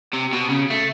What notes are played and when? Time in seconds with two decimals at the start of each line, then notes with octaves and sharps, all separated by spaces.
0.14 C3
0.33 B2
0.50 C#3
0.70 A3